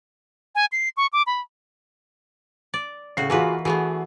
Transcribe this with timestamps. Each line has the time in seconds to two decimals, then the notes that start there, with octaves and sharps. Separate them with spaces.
0.55 G#5
0.72 C7
0.97 C#6
1.13 D6
1.27 B5
2.74 D5
3.17 A2 C#3 F#4 C7
3.30 E3 A#3 F4 F#4 G#4 B4
3.65 E3 A3 B3 F#4 G#4